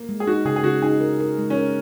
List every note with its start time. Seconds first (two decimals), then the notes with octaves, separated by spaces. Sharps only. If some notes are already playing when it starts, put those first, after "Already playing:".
Already playing: A#3
0.09 G#3
0.20 G#4
0.27 D#4 F#4
0.45 C#3 G#4
0.56 G#4
0.63 C#3 F#4
0.82 D#4 G#4
1.00 A#4
1.20 A#4
1.38 G#3
1.50 C#4
1.57 A#4